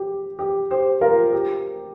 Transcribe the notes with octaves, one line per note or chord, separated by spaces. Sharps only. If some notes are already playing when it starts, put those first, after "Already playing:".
Already playing: G4
G4
G4 C5
F4 A#4
G4